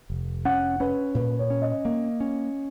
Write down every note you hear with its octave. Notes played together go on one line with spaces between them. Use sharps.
F1
C#4 F#5
C#4 B4
A#2 B4
C#5
C#4
D#5
A#3
C#4